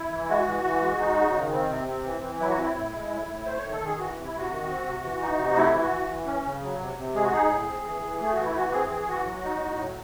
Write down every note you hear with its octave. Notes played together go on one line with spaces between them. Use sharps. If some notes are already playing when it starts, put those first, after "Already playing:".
Already playing: E4
E3
G#3 F#4
E3
E3
G#3
D#4
C#3
D#3
C4
C3
C4
E3
E3
F#3 E4
F#4
C4 E4
A2
G#3
A2
A2
A3 C5
C#5
D#3
A4
D#3 G#4
E3 F#4
C3
E4
C3 F#4
D#3
C4
C3
E3
D#4
C3
A3 E4
E3
F#4
E3
E3
C#4
C#3
F#3
C3
C3
G#3 G#4
F#4
D#4 G#4
A2
C4
E3
E3
A3 G#4
E3 F#4
E4
E3 F#4
C4 G#4
E3 G#4
E3 F#4
F#3
D#4
A2
F#3